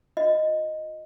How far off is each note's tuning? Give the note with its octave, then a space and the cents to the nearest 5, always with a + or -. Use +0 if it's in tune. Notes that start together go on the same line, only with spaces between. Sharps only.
F4 +35 D#5 +0